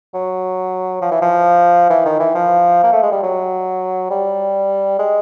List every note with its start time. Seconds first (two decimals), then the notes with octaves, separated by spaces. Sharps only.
0.14 F#3
1.02 F3
1.11 E3
1.22 F3
1.90 E3
2.05 D#3
2.20 E3
2.35 F3
2.83 A#3
2.93 A3
3.03 G#3
3.12 G3
3.23 F#3
4.10 G3
4.99 G#3